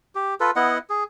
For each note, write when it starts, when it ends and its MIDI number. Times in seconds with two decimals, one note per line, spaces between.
0.15 0.34 67
0.40 0.51 65
0.40 0.51 69
0.40 0.51 71
0.56 0.78 59
0.56 0.78 64
0.56 0.78 75
0.56 0.78 78
0.90 1.04 68